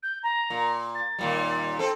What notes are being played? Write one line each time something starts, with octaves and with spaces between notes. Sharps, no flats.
G6
A#5
A#2
A6
D#2 A#2 G3
C4 A4